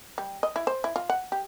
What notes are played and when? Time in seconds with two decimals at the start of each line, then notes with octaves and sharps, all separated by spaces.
0.18 G3
0.43 D#5
0.56 E4
0.67 C5
0.84 E4
0.96 F4
1.10 F#5
1.32 G4